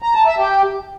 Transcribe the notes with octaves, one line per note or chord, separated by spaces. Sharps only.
A#5
A5
E5
G4